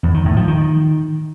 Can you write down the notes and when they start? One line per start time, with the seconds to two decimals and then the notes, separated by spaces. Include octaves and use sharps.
0.03 E2
0.14 D#3
0.25 A2
0.37 F3
0.48 D#3